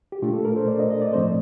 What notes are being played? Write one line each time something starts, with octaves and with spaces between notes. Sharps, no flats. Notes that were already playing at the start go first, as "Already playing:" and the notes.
G4
A#2 A3 D4 F4
A4
A#4
C5
D5
D#5
D#5
D5
A2 F3 A3 C4 C5